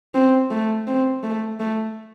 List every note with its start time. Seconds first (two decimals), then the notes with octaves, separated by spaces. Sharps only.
0.14 C4
0.51 A3
0.87 C4
1.23 A3
1.60 A3